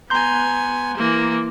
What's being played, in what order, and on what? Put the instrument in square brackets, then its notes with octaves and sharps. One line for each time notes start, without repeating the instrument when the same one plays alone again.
[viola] B3 G#5 [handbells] A#5 C6 G6
[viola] E3 A#3